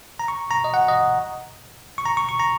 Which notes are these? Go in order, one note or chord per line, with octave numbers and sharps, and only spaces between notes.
A#5
C#6
A#5
D#5
F#5
D#5
C#6
A#5
C#6
C#6
A#5